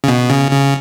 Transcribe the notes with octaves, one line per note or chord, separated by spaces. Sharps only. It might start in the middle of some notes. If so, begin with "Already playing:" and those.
C#3
B2
C#3
C#3